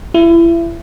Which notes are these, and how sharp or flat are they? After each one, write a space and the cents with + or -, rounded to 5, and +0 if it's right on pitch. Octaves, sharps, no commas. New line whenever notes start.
E4 +30